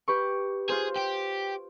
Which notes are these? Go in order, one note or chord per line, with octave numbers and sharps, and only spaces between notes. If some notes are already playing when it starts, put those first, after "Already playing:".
G4 B4 C#6
F4 G#4 C5
G4